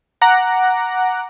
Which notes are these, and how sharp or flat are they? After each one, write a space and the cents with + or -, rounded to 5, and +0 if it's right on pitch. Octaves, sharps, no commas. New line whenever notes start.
F#5 +0 A#5 +0 D6 +0